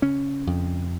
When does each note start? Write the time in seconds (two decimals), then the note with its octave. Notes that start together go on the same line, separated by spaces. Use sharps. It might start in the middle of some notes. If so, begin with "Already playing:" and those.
0.02 C#3 C#4
0.47 F2